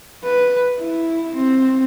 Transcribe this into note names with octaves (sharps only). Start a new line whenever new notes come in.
B4
E4
C4